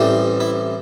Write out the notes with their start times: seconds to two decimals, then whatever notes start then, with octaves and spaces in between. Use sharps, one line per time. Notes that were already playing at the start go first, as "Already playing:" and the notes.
Already playing: A1 A2 E3 G3 C4
0.40 E4